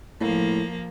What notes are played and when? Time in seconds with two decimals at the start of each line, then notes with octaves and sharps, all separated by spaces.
0.20 A2 F3 A#3